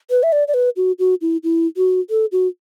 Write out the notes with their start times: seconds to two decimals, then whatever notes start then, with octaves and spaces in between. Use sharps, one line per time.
0.10 B4
0.23 E5
0.32 D5
0.48 D5
0.54 B4
0.77 F#4
0.99 F#4
1.21 E4
1.44 E4
1.77 F#4
2.10 A4
2.32 F#4